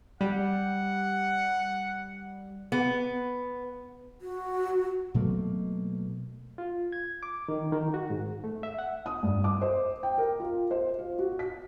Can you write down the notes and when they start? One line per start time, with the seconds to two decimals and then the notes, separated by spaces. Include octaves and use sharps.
0.21 G3 F#5
2.72 B3
4.21 F#4
5.14 B2 F#3 A3 A#3
6.58 F4
6.92 G#6
7.23 D6
7.48 D#3
7.72 D#3
7.94 F#4
8.10 G#2
8.44 A3
8.63 E5
8.79 F#5
9.06 D#6
9.23 G2
9.44 D6
9.62 C5
10.03 G5
10.18 A#4
10.40 F4
10.71 C5
10.99 F4
11.19 F#4
11.39 B6